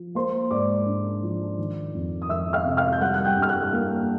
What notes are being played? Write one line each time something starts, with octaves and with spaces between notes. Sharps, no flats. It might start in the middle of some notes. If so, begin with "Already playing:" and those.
Already playing: F3
A#3 C5 C6
G#2 D5 D6
D4
F3
D#3
F2
D#6
F2 E5 E6
F5 F6
C3
F5 F6
G6
G3 F#5 F#6
F#6
G5 G6
G2
F6
F#5 F#6
A#3